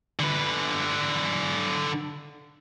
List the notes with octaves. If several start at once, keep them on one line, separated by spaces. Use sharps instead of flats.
D3 B4